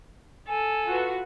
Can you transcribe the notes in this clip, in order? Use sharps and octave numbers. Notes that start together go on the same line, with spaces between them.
A4 G#5
F4 F#4 B4